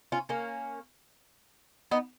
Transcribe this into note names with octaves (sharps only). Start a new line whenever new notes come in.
C#4 F4
A#3 C#4
B3 D#4